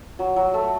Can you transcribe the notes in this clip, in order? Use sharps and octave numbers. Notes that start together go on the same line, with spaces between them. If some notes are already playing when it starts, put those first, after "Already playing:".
F#3
F#3
A3